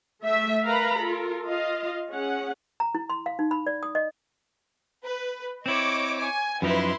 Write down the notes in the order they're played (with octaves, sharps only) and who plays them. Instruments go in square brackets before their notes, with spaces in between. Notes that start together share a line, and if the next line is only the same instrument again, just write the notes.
[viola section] A3 E5
A#4 B4 F5 A#5 B5
F4 A4 A#4
F4 D#5 F5
C#4 G#4 F#5
[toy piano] A#5
E4
C6
F5
D#4
B5
D5
D#6
D#5
[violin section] B4
[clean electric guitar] C4 E4 [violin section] C#5 D#5 D6
[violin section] G#5
[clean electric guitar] F#2 F3 D#4 [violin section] E4 B4 C6